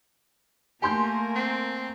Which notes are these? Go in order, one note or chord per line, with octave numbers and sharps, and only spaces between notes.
A3 A#3 G4 A#4 G#5 C6 G6
C4